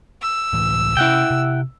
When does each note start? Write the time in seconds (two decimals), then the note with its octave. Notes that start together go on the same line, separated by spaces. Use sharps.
0.22 E6
0.53 C#2 A2 E3
0.97 C3 C#4 E4 F#5 G5
1.31 C3